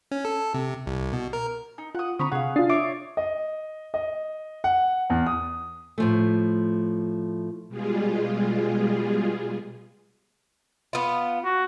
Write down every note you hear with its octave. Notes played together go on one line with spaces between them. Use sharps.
C#4
A4
C3
C2
B2
A#4
D#4
F4 F#5 D#6
D3 C4 A#5 B5 C#6 D#6
C3 G#4 F5 F#5
D4 F4 D#6 A6 C7
C#5 E5 D6
D#5
D#5
F#5
E2
D#6
A2 F3 A3
B2 G3 G#3 F4 G#4
B3 F4
F#4